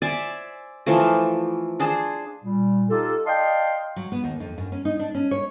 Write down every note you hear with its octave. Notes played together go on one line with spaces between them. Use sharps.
C5 D5 E5 G#5
E3 F3 A3
D4 G#4 C5
A#2 G3
D#4 F4 G4 A4
D5 D#5 F5 G5 A5 C6
F#3
B3
D#2
F2
F#2
C#4
D#4
D4
C#4
C#5